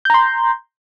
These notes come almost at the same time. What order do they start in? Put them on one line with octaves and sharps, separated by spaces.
G6 A#5 C6